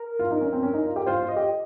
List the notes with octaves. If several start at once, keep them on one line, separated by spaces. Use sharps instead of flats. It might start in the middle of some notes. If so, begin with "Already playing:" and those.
Already playing: A#4
F4
D#4
C#4
C4
C#4
D#4
F4
G4
F4 C5
F4
D#5
G4